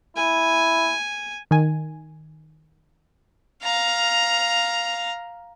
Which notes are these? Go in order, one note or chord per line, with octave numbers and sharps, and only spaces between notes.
E4 G#5
D#3 G#5
F5 A#5